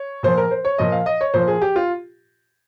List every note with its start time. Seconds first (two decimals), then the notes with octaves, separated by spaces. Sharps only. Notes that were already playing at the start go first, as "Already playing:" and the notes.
Already playing: C#5
0.23 A#2 F3 C5
0.37 A#4
0.51 C5
0.65 C#5
0.78 A#2 F3 D#5
0.92 F5
1.06 D#5
1.21 C#5
1.34 A#2 F3 C5
1.48 G#4
1.62 G4
1.76 F4